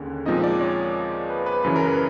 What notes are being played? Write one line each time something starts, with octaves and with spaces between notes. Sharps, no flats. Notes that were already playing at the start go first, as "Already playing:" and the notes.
Already playing: D#2 D3 G#3 C#4
A#2 F3 G#3 C4 D#4 D#5
D5
C#5
B4
B4
F#2 C#3 E3 B4
A#4
B4